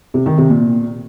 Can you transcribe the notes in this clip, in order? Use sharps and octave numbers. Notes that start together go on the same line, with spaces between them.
C3
D#3
C3
A#2